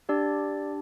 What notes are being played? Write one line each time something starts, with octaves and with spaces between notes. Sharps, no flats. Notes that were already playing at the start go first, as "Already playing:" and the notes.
D4 G4 D5